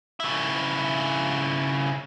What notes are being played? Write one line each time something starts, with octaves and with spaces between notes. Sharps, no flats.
C#3 E4